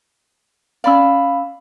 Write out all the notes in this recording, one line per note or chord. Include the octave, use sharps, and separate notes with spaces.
C#4 D5 F5 B5 E6